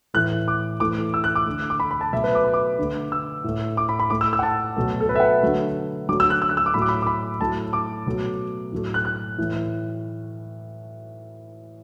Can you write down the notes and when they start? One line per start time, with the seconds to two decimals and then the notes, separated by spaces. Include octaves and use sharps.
0.14 A2 E3 A3 F#6
0.48 D6
0.80 A2 E3 A3 D6
1.14 E6
1.24 F#6
1.35 D6
1.46 D3 A3
1.70 D6
1.80 B5
1.91 B5
2.01 A5
2.12 B2 F#3 A3 E5
2.24 B4
2.35 D6
2.44 B5
2.54 D6
2.79 D3 A3
3.12 E6
3.44 A2 A3
3.77 D6
3.89 B5
3.99 B5
4.10 A2 A3 D6
4.21 E6
4.33 E6
4.39 F#5
4.43 A5
4.77 B2 F#3 A3
5.00 A4
5.09 B4
5.16 E5
5.20 F#5
5.43 D3 F#3 A3
6.09 D3 F#3 A3 D6
6.20 E6
6.30 F#6
6.42 E6
6.49 F#6
6.57 E6
6.66 D6
6.74 A2 F#3 A3 B5
6.82 D6
6.89 B5
7.02 D6
7.07 B5
7.40 A2 F#3 A3 A5
7.73 D6
8.06 B2 F#3 A3
8.72 A2 F#3 A3
8.94 F#6
9.05 F#6
9.38 A2 E3 A3